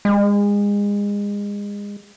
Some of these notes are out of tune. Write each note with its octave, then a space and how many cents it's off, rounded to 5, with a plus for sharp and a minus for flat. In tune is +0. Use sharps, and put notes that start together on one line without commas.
G#3 -30